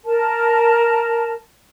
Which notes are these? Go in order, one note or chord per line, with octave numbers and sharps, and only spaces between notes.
A#4 A5